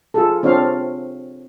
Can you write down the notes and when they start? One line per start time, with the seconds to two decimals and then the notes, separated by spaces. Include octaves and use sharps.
0.14 F4 G#4 A4
0.43 C4 D4 F4 C#5 F5